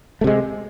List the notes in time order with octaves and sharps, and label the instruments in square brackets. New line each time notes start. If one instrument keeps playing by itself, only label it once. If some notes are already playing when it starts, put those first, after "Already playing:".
[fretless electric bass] A3
C3
G#3